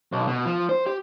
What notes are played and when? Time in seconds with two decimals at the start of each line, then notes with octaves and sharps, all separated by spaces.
0.12 B1
0.27 B2
0.45 F3
0.69 C5
0.86 G4